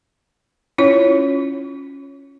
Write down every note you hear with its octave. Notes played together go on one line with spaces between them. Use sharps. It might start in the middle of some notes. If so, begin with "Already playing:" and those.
C#4 E4 F4 C#5